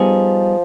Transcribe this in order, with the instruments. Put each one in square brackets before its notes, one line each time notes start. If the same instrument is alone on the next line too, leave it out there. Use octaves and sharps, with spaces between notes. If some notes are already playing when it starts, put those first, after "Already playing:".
Already playing: [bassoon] F3 [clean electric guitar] G3 B3 D#4 G#4